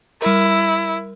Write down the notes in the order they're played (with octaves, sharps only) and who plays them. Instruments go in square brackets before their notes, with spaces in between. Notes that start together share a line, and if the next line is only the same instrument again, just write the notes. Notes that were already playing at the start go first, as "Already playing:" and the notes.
[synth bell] G3 A#4 [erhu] E4